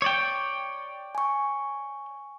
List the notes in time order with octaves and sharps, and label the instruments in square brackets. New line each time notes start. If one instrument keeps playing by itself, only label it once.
[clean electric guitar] C#5 D5 G5
[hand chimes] G#5 C#6